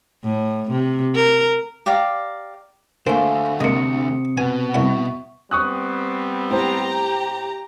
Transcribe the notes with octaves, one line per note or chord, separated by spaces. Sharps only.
A2
C3
A#4
G4 D5 F5 A#5
D2 D3 A3 A#3 C5 F5 G#5
C3 G#3 A#3 D#6 C#7
B2 B4 F#5 G#5
C2 E5 F#5 C#6
G3 B3 C4 C#6 D#6 F#6
A2 G4 C5 A#5